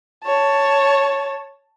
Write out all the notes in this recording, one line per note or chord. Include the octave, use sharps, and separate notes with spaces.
C#5 A5